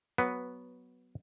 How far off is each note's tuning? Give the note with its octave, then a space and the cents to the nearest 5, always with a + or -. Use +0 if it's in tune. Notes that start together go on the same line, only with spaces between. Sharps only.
F#3 +0 B3 +0 B4 +10